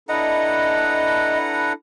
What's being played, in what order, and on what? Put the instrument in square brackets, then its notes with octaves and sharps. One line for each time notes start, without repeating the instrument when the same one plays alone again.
[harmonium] D4 E4 A4 [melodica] B4 F#5 A#5 [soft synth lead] D#5